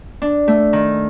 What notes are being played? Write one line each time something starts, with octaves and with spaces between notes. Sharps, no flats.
D4
A3
D#3